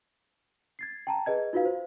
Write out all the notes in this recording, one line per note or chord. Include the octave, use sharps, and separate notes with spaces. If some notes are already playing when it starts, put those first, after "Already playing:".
G#6 A6 C7
G5 A5 A#5
G#4 B4 D#5 G#6
D#4 F4 F#4 B4 F5
C5